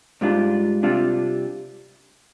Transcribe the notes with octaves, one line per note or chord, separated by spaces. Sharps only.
G#2 G3 D4 F4
C3 G3 D4 F4